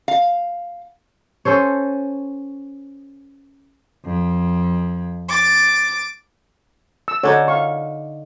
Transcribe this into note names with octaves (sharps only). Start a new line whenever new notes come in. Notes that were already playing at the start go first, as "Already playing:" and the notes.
F5
C#4 A4 C5 C#5
F2
D6 A6
E6
D3 D4 D#4 C#5 G#5
F5 C#6